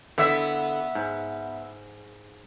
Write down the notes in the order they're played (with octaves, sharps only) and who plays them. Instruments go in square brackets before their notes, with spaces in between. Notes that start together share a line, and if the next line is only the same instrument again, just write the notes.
[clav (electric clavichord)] D3 E4 [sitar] B3 E5
[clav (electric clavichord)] G#2